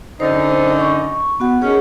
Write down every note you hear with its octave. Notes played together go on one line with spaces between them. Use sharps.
F#2 D3 D#4 C5
C#6
B3 F#4 F#5
G#2 D#3 C#4 G#4 C#5 F#5